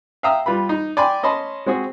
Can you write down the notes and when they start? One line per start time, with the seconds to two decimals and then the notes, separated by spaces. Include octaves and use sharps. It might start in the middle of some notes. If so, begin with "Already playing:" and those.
0.23 E5 F5 G5 A#5 D#6 E6
0.46 G3 F4 B4 B5
0.69 D#4
0.97 D5 G5 G#5 B5 C6 D6
1.23 C#4 D#5 A5 B5 C6
1.66 G#3 C4 F#4 G#4